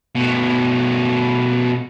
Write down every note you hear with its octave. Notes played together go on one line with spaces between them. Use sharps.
B2 A3